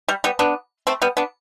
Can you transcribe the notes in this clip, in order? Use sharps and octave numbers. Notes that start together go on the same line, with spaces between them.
G3
G3 B3
B3 D4
A3 C4
G3 B3
B3 D4